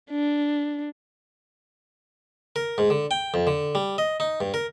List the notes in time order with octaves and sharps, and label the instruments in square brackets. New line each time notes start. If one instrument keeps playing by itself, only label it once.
[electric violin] D4
[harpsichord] A#4
G#2
D3
G5
F2
D3
G3
D#5
D#4
G2
A#4